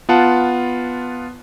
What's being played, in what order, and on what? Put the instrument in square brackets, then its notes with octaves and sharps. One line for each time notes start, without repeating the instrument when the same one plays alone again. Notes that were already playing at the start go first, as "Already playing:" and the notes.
[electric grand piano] B3 F4 F#5 A5